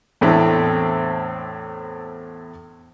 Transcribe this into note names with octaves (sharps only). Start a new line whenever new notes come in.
E2 A2 A3 C4 D4